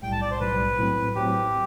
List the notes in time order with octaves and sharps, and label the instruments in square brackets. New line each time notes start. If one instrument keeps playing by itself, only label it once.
[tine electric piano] B1 A2 G3 [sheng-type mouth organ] G5
[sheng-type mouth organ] A5
D5
C5
[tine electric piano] B1 A2 G3 [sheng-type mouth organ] B4
[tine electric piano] A2 F#3 C4
[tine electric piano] A2 F#3 C4 [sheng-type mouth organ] G4